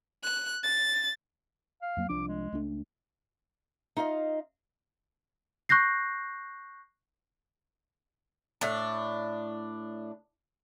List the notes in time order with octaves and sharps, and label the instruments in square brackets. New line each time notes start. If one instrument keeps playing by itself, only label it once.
[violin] F#6
A6
[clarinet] F5
[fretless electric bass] F2 F#3 A#3
[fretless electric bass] C2 F3 D4 [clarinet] D6
[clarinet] G#3
[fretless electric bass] C#2 A3 D4
[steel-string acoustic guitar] D#4 F4 D#5 F5
[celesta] C#6 F#6 G6 A#6 C7
[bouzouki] A2 D4